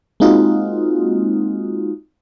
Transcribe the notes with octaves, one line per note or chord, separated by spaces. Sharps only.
G#3 A#3 C4 D#4 F4 F#4